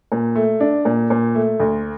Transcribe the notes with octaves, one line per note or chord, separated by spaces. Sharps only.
A#2
A3
D4
A#2
A#2
A3
D2